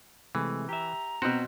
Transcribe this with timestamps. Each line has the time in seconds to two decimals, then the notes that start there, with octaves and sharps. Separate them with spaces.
0.35 C3 E3 G#3 A3
0.69 G4 E5 A#5
1.22 B2 C4 F#4